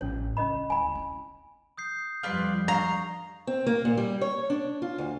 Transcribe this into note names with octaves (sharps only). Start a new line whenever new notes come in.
A1 C#4 C#5
C#2 C#4 D#5 B5
D2 E4 G#5 B5
C4 E4
D#6 G6 C7
F2 G3 F4 B4 D5
F5 A#5 C#6 C7
C4
A#3
A#2
G3
C#5
D4
F4
D2